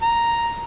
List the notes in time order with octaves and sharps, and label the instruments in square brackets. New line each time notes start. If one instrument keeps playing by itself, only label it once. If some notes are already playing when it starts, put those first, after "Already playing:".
[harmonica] A#5